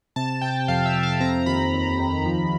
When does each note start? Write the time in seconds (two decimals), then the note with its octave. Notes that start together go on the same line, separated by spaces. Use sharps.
0.16 C3 A5
0.41 C3 G5
0.68 F2 F5
0.85 E5
0.95 F2
1.03 F5
1.20 C4 A#5
1.46 D#2 B5
1.74 D#2
1.99 D#3
2.25 F3